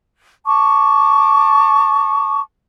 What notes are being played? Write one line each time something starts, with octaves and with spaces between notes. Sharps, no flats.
A5 C#6 D6